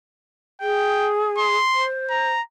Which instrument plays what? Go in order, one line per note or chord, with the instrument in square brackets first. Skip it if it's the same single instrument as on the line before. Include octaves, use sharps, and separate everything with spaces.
[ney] G#4 [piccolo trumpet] G5
[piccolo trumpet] C6
[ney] C5
[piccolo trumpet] A#5